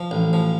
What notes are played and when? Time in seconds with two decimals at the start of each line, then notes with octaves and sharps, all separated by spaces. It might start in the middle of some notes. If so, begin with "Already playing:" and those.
Already playing: F3
0.11 A1
0.33 F3